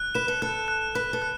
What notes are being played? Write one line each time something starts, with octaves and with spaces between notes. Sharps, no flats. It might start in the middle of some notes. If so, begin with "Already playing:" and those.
Already playing: F#6
B4 E7
A4
A4 F#6
F#6
B4 F#6
A4
F#6